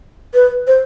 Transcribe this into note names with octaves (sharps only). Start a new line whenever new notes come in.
B4
C5